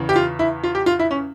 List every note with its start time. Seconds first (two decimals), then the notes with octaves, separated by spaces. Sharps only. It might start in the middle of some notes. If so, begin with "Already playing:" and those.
Already playing: E2 C#3 E3
0.09 G4
0.16 F4
0.39 E4
0.64 F4
0.75 G4
0.86 F4
0.99 E4
1.11 C#4